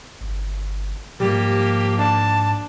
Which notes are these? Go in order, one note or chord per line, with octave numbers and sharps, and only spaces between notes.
G1
G#2 F3 G3 A#3 G4
D4 A5